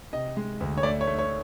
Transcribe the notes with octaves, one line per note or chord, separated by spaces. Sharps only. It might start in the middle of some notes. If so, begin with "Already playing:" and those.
C3 D#5
G#3
D2
C#5
A3 D5
C#5
A3
C#5